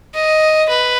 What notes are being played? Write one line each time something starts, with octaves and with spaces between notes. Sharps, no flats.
D#5
B4